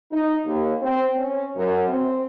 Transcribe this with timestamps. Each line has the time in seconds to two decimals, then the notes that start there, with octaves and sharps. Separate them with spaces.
0.11 D#4
0.46 D#2
0.82 C4
1.16 C#4
1.56 F#2
1.89 C4